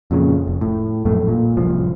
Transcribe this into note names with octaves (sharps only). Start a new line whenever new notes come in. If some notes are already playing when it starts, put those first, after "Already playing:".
F2 A#2 C#3
F1
A2
A#1 F#2 A2 A3
A#2
D1 C2 F3